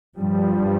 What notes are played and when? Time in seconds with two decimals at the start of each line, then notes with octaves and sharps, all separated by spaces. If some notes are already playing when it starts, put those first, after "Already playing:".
0.18 G2 F3 G3